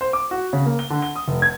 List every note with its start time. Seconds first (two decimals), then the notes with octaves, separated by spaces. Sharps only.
0.01 C5
0.13 D6
0.31 F#4
0.53 C#3
0.66 A#3
0.79 G7
0.90 D3
1.02 G7
1.16 D#6
1.28 F1
1.42 G#6